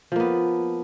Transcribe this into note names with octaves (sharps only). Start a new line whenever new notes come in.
F3 A#3 B3